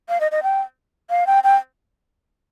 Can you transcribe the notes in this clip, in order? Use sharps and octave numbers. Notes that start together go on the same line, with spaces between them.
F5
D#5
D#5
G5
F5
G5
G5